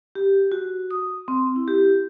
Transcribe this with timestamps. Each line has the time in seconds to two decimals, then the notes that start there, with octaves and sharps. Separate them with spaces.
0.15 G4
0.52 F#4
0.91 D#6
1.28 C4
1.56 E4
1.68 G4